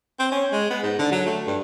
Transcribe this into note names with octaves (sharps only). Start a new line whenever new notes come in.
C4
C#4
G#3
B3
G#2
D3
F#3
A3
G2